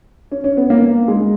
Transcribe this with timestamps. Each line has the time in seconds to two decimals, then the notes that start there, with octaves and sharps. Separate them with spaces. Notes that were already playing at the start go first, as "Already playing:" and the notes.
0.32 C#4
0.44 C#4
0.57 B3
0.70 A#3
1.08 G#3